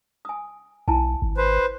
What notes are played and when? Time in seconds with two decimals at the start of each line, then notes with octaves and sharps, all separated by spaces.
0.25 G#5 D#6
0.88 B1 E4 G#5 A5
1.22 G#1
1.37 B4 C5